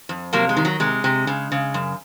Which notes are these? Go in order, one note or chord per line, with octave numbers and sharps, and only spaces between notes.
F2
C3 F#3 A#3
G#3
D#3
F#3
C3 G#3
C3
C#3
C#3
F#2